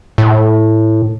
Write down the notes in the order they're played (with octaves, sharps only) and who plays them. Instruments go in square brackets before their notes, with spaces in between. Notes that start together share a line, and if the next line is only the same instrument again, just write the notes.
[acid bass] A2